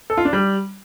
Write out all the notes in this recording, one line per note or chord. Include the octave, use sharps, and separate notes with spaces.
A4
F4
D4
G3